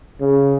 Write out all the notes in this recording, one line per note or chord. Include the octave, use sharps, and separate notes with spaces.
C#3